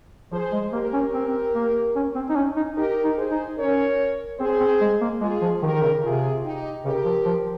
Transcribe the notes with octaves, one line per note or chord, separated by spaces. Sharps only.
F3 G#4 C5
G#3
A#3 G4 A#4
C#4
C4
A#3
C#4
C4
D#4
C#4
D#4
D#4 G4 A#4
D#4
G#4 C5
D#4
C#4 A#4 C#5
C4 G#4 C5
C4
G#3
A#3
G#3 F4 G#4
F3
D#3 G4 A#4
D#3
C#3
C3 F4 G#4
D#4 G4
C#3 G4 A#4
F3
F3